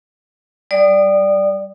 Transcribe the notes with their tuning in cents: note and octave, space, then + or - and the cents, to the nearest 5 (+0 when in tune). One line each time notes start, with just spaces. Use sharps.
G3 -15 D5 +0 D#6 -25